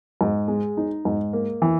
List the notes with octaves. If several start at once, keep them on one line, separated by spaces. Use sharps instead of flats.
G#2
G#3
D#4
G#2
A#3
E3